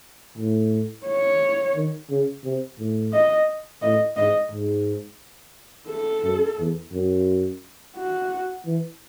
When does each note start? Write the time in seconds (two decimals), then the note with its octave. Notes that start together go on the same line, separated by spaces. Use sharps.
0.38 A2
1.07 C#5
1.75 D#3
2.10 C#3
2.45 C3
2.79 A2
3.13 D#5
3.82 A2 D#5
4.17 G#2 D#5
4.51 G#2
5.89 A4
6.24 F#2
6.58 E2
6.93 F#2
7.97 F#4
8.65 E3